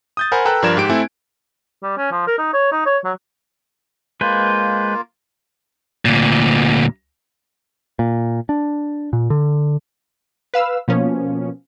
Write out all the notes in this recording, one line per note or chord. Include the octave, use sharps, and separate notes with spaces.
D#6 G6 A6
A#4 C5 F#5 G#5 B5
A4 B4 G5 A#5 E6 F#6
G2 F3 A#4 D5 G#6 E7
G#2 G4 D7
A3 C4 E4 G#5
G3
C#4
F3
A#4
D#4
C#5
D#4
C#5
F#3
G#3 A#3 F4 B4 C5
D2 A#2
A#2
D4
A#2
D3
B4 F5 E6
B2 F3 A#3 C#4